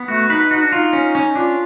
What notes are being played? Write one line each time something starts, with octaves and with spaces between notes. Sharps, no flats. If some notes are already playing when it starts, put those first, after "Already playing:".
Already playing: B3
A3 F#4
D#4 B4
D#4 F#4
D4
D#4 F4
C#4
C#4
D4 F4